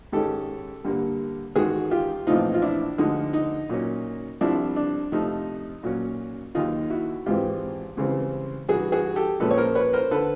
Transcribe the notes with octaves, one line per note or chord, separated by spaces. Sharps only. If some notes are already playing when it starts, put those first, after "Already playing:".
G#2 D#3 G#3 C#4 G4 A4
G2 D3 G3 A#3
A1 G#2 D#3 F#4 G#4
F4 G4
A#1 A2 E3 A3 C4 D#4 F4
F4
D4 E4
D2 D3 F3 G#3 D#4
D#4
A#2 F#3 A#3 C#4
C2 C3 F3 D4 E4
D4
F2 C3 F3 A3 D#4
A#2 F#3 A#3 C#4
D#2 D#3 F#3 D#4 F4
E4 F#4
G#1 G#2 E3 G#3 C4 F4 G4
C#2 C#3 E3 G3 C4
G2 E3 G3 F#4 G#4
F#4 G#4
G4 A4
A#2 F3 G#3 C#4 A4 B4
C#5
A#4 C5
B4 C#5
A#4 C5
D3 A4 B4